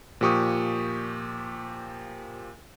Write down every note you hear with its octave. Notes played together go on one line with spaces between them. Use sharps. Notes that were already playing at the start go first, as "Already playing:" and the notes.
A#2 F3 G4 C#6 D#6